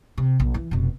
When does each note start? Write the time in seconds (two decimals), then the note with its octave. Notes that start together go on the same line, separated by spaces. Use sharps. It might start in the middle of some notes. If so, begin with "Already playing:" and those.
0.18 C3
0.40 A#1
0.54 E3
0.71 F1 B2